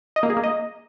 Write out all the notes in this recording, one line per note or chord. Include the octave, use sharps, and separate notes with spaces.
D#5
A#3
G#4
A#3
D#5